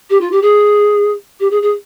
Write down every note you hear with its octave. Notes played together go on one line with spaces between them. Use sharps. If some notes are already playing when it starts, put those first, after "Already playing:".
G4
F4
G4
G#4
G4
G#4
G#4